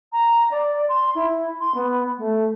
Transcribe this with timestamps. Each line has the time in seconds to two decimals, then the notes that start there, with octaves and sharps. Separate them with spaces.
0.13 A#5
0.51 D5
0.89 C6
1.15 E4
1.60 C6
1.74 B3
2.18 A3